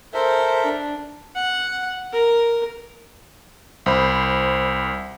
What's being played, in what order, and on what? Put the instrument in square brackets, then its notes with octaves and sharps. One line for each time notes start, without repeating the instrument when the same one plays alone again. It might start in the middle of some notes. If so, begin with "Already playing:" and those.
[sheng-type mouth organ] A4 A#4 E5 [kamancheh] C5
[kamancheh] D4
[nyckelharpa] F#5
A#4
[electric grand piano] C2 C5 B5